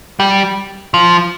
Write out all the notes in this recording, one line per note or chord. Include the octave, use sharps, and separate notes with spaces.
G3
F3